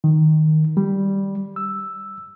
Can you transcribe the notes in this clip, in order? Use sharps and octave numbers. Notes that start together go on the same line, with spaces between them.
D#3
G3
E6